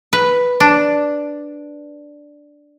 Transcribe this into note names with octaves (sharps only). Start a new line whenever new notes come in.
B4
D4